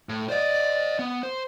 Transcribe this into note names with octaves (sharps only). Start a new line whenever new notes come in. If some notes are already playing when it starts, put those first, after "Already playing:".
A2
C5 D5 D#5
B3
C5